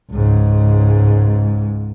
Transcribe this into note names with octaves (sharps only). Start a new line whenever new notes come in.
C#2 G#2